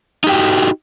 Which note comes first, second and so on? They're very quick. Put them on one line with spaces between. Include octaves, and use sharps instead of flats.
D#4 G4 G5 F#4